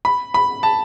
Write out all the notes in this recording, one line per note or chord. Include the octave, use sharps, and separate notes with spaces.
B5
B5
A5